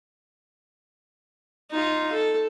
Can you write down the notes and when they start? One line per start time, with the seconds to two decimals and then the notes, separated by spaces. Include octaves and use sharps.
1.71 D#4 F4
2.12 A4